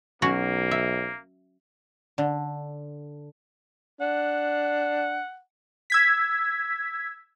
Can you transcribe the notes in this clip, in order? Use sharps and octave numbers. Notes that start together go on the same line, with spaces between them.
B1 F#3 A#3 C#4 F#4
E5
D3
D4 F#5
E6 G#6 B6